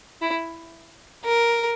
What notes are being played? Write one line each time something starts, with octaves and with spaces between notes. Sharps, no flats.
E4
A#4